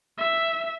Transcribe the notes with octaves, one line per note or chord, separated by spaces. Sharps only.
E5